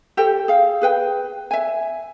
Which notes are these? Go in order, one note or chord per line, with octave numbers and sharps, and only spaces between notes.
G4 A4 C5 G5
G#4 F5
G#4 B4 G5
E5 G#5